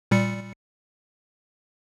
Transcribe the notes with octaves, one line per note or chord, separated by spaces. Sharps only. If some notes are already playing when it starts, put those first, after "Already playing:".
A#2 G3 C#7